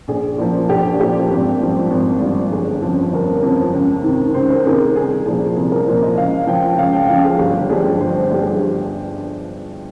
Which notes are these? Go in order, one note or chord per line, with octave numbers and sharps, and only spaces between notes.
A#1 G#4
A#2 F3
A#1 G4
A#2 F3 G4
G#1
G2 F3
G#1
G2 F3
G1 G#4
F2 C#3 F3
G1 A#4
F2 C#3 F3
C#2
C3 D#3
C#2 C5
A#4
C3 D#3 G#4
C2 G#4
A#2 F3 G#4
C2 G#4
A#4
A#2 F3 C5
D#5
C#2 F5
C#3 F3 G5
C#2 F5
G5
C#3 F3 F5
G#4
G1 G4
G2 F3 G#4
G1 C5
G2 F3 G4
G#4